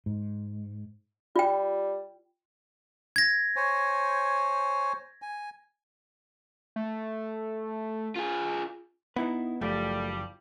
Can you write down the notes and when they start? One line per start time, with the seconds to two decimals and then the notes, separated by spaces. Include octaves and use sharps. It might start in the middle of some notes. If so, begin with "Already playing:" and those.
0.06 G#2
1.36 G3 F4 G5
3.16 G#6 A#6
3.56 C5 C#5 G#5
5.22 G#5
6.76 A3
8.16 F4 G#4
9.16 B3 D#4 E4 B4
9.61 F#1 F3 G3 A3